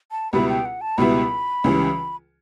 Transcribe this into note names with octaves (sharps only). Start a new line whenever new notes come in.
A5
C#2 B2 G3 B3 E4 B5
G5
F#5
A5
C#2 B2 G3 B3 E4 B5
C#2 C#3 E3 G3